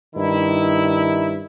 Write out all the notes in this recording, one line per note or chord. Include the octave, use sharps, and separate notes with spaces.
G2 D#3 E4